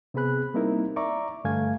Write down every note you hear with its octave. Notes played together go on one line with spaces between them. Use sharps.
C3 B3 C4 G#4 B5 F#6
G3 A#3 C4 D#4 E4 A#4
D5 E5 A#5 C#6 D6
G2 D3 A3 F5 G#5 G#6